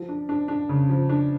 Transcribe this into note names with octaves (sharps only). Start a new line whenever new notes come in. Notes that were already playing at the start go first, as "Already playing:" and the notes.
Already playing: F3
D4
D4
D4
C#3
F3
D4